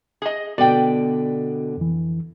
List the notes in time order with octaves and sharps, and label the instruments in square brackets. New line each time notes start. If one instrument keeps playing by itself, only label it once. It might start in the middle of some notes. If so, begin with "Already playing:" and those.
[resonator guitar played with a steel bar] G#4 D#5
[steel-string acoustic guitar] B2 D3 [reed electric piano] B3 F#4 [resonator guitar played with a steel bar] D5 G5
[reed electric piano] F2 E3